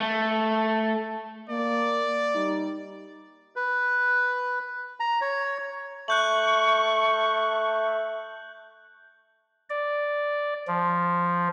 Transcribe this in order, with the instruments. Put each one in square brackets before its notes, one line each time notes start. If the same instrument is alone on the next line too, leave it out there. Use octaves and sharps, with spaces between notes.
[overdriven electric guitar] A3
[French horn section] A#3 [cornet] D5
[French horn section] G3 D#4
[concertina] B4
A#5
C#5
[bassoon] A3 [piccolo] C#6 [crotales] F#6 G6 F#7
[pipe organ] D5
F3